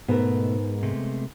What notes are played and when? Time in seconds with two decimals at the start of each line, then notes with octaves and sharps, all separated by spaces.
0.08 G#2 B2 A3 B3 A#4
0.83 C3 G#3 A3